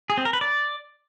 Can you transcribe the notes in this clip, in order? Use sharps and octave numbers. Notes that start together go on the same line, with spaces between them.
G#4
C4
A#4
B4
D5